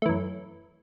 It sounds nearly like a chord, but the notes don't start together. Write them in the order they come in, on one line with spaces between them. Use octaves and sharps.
A3 E3 F#2